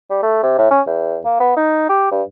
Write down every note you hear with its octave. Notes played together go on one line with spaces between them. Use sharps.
G3
A3
C3
A2
C#4
E2
A#3
B3
D#4
G4
G2